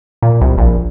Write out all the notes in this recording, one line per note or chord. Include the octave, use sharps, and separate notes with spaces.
A#2
C2
A#1